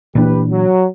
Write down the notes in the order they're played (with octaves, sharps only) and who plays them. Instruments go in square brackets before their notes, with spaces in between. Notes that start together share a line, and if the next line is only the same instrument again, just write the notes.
[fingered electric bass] A#2 E3 D4 [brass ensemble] G4 B4
[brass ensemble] F#3